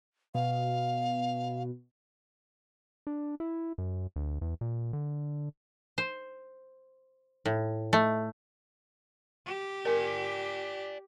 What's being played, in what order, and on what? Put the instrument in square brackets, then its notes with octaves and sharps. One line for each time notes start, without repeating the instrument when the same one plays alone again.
[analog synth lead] B2 [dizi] F5
[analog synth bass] D4
E4
F#2
D2
E2
A#2
D3
[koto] C5
A2
A3
[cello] G4
[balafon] A#4 [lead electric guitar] D5 G#5